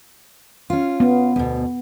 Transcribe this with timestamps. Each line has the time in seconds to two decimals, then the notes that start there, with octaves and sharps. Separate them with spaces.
0.70 C#4 F4
1.00 B3
1.36 D2 B2